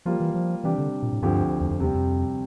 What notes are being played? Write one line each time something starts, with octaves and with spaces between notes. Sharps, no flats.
F3 G3 A#3 F4
E3
F3
C3 E3 G3 D4 G4
D3
A#2
A2
D2 G2 D3 F3 C4 G4
E2
F2
E2 C3 G3 C4
F2